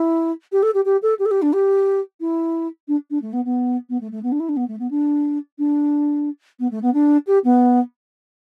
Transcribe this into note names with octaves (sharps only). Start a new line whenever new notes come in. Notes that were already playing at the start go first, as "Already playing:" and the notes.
Already playing: E4
G4
A4
G4
G4
A4
G4
A4
G4
D4
G4
E4
D4
D4
A3
B3
B3
B3
A3
A3
B3
D4
E4
D4
B3
A3
B3
D4
D4
B3
A3
B3
D4
G4
B3